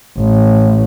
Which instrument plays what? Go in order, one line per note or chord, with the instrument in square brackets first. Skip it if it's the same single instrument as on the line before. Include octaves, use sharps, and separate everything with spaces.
[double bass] A1